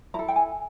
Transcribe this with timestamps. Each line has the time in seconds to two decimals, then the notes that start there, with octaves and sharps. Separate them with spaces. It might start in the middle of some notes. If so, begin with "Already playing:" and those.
0.14 E4 A4 A#5
0.28 G5
0.36 G#5